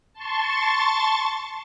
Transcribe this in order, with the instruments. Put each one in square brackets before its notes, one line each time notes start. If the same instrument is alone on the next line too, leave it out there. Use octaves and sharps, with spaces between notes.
[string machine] A5 C6 C#6 A6